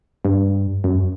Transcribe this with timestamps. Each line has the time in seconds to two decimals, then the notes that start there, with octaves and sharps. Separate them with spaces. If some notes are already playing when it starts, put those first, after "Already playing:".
0.25 G2
0.84 F#2